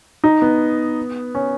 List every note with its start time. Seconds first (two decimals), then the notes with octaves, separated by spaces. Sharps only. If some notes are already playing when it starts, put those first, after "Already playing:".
0.24 D#4
0.42 B3
1.35 C#4